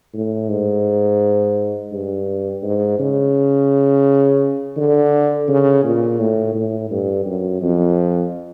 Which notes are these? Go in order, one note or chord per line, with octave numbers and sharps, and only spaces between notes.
A2
G#2
G2
G#2
C#3
D3
C#3
A#2
A2
A2
G2
F#2
F2